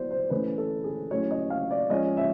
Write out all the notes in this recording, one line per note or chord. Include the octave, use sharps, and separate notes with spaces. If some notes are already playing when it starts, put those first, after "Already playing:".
Already playing: F#3 B3 E4 C5 D5
C5
E3 A3 C#4 B4
A4
G#4
F#3 A3 C#4 E4 C#5
D#5
F5
D5
F3 G#3 C#4 D#5
E5